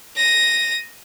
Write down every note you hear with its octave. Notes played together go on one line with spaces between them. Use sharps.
A#6 D#7